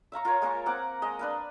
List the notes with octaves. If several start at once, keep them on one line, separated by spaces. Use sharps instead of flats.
E5 F5 A#5 C#6
F4 A#4 C#5
G#3 A#3 A#4 C#6
A#3 C4 F#5 D6
G#3 D#5
D4 B4 F5